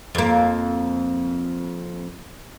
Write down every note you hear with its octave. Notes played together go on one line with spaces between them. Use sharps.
F2 A#3